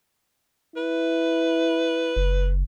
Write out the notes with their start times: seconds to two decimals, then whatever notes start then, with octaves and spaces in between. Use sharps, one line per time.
0.76 E4 B4
2.16 F#1